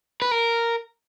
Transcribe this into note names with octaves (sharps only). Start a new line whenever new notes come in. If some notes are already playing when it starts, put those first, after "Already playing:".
B4
A#4